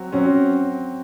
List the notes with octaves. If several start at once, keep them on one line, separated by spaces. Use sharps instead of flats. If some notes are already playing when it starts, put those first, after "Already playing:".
Already playing: F#3 C4 F#4
F#3 C4 C#4 F#4